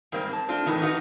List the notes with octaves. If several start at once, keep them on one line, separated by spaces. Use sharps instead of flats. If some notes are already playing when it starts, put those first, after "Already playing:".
G#2 G3 A#3 C4
A5
A3 C4 D4 F4
F2 A2 D#3 E3
D#4 F4 F#4 B4